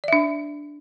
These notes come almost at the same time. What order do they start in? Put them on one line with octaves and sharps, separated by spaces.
D5 E5 D4